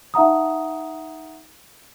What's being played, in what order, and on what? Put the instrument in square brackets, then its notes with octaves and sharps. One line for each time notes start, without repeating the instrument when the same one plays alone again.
[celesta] D#4 E5 F#5 A#5 D#6